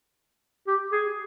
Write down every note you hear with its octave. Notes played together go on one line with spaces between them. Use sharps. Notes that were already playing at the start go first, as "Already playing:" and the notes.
G4
G#4